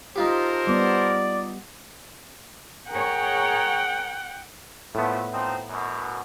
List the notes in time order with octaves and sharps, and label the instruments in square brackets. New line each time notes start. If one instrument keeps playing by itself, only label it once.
[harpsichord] D#4 F4 G4 [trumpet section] A4 A#4 C5
[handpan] G3 B3 [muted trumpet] D5
[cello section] G#4 A#4 C#5 [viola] F#5 G5
[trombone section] A#1 F3 A3 [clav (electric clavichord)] A2 B3
[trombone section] F3 C4 D#4
F#2 B2